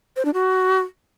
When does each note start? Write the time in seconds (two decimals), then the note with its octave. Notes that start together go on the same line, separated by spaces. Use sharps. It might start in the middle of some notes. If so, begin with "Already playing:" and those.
0.16 C5
0.25 D4
0.34 F#4